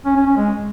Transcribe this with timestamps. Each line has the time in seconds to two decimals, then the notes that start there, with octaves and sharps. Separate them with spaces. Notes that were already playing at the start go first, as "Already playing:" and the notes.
0.05 C#4
0.16 C#4
0.26 C#4
0.37 G#3